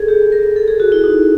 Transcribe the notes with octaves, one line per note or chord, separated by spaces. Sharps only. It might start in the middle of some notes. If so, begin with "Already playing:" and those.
Already playing: G#4 A4
G4
A#4
A4
G#4
F#4
E4
D#4